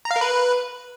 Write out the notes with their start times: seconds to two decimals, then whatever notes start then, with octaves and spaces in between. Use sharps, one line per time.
0.05 A#5
0.11 F5
0.16 A#4
0.21 B4